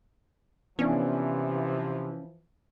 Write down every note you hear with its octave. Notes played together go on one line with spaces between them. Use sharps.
C3 E3 F3 B3 C#4 D4